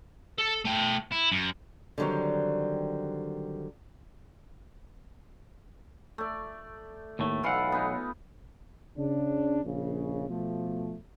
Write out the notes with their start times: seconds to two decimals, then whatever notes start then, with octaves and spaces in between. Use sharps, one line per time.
0.38 A4
0.65 A3 G5
1.12 E4
1.32 F#2
1.98 D3 D#3 F#3 G3 C4
6.18 A3 D5
7.19 D#2 A2 A3
7.43 B1 E3 F4 F5 F#5
7.72 B3 D#4
8.97 C#3 D4
9.64 A#1 C#3
10.28 B2 F3 A3